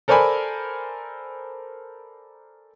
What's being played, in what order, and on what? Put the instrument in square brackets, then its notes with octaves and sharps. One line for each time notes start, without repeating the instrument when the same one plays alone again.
[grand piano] A4 A#4 C5 D5 G#5 B5